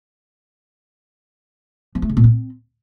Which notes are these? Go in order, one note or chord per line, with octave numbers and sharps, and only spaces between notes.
F3
A3
C#3
A#2
C4